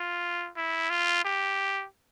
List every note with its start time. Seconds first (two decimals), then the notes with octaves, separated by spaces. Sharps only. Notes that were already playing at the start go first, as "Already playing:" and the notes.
Already playing: F4
0.56 E4
0.90 F4
1.25 G4